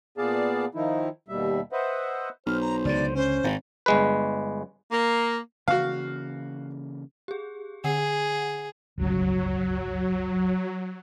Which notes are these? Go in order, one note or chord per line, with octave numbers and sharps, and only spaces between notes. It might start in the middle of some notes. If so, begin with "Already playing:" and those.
A#2 B3 G#4 D5 F5 A5
D#3 F3 D#4 E4
D#2 B2 G3 E5
B4 C5 D#5 E5 F#5
B1 C5 F6
A#5
C#2 D3 D5
C#4 C5
G#1 G#2 D#3
G1 G#3 B4
A#3
C#3 E3 A#3 F#4 F5
G4 G#4
D3 G#4 F#5 C7
D1 G1 C#2 F#3